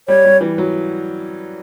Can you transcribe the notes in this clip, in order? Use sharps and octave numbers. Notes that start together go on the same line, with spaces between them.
G3 C#5
G3
E3
F#3